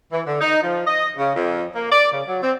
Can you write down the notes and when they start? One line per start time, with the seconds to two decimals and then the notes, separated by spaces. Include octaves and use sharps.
0.12 E3
0.25 D3
0.41 D#4
0.62 F3
0.86 D#5
1.17 C#3
1.36 F2
1.74 A#3
1.90 D5
2.11 C#3
2.27 F#3
2.42 C4